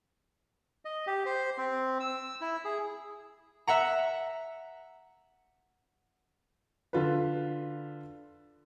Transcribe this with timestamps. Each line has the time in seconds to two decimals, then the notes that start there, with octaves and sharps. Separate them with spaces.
0.85 D#5
1.07 G4
1.26 C5
1.58 C4
2.00 E6
2.41 E4
2.65 G#4
3.67 E5 F#5 A#5
6.93 D3 F4 B4